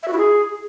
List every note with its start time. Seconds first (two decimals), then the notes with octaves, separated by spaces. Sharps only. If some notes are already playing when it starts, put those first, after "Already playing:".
0.03 E5
0.08 F#4
0.13 E4
0.18 G#4